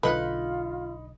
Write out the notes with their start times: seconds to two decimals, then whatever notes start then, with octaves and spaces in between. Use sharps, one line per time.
0.03 B1 D3 G#3 D#4 F4 B4 B5 F#6